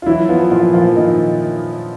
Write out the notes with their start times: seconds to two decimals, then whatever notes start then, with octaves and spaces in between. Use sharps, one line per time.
0.02 F4
0.06 E3 F#3 E4
0.29 F3 B3 F4
0.52 A#2 F3 F4
0.74 A#2 F3 F4
0.96 A#2 D#3 D#4